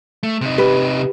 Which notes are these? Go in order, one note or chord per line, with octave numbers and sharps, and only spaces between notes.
A3
C3 D#4
G4 B4